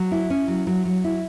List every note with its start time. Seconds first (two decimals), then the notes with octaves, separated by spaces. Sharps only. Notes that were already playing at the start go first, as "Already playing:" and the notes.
Already playing: F#3
0.12 E4
0.30 C#4
0.48 F#3
0.67 F#3
0.85 F#3
1.04 E4